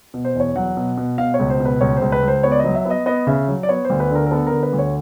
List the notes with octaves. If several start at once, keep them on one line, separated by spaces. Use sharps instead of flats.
B2
C5
E2
C#5
F#3 F#5
B2
B2
B2 F5
C#5
C#2
C5
B2
B4
C#2 C#5
C#2 C5
B4
C#2
C5
B3 C#5
D5
F#3 D#5
E5
B3 D#5
B3 D#5
C#3 E5
F#3
D5
B3 C#5
C5
D2
B4
D3 A#4
A#4
B3 A4
A#4
D3
B4
D2
C#5